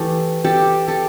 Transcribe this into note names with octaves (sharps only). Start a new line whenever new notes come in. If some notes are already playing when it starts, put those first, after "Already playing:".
Already playing: E3 A3 G4 A4
G4 A4
G4 A4